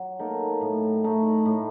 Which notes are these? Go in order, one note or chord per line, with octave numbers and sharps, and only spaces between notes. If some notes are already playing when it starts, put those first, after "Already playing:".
Already playing: F#3
A#3 D#4 A4
A2
A3 D#4
A2